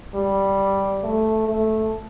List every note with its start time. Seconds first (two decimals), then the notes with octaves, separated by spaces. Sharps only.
0.14 G3
1.04 A3
1.49 A3